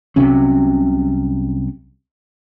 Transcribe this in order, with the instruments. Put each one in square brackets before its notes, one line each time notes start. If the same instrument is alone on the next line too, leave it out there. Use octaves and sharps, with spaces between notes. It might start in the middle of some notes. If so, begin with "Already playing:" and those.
[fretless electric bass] C2 C3 F#3 C#4